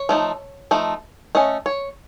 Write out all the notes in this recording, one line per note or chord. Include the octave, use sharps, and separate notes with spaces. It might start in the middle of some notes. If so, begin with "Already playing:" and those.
Already playing: C#5
F3 A3 D#4
F3 A3 D#4
A3 C#4 D#5
C#5